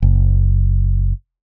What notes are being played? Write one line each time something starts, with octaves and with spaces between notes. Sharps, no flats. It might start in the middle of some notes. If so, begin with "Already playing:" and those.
F#1